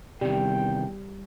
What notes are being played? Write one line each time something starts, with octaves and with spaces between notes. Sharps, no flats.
E2 C3 D#3 G3 G5